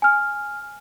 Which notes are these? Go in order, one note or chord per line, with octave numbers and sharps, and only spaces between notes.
G#5 F6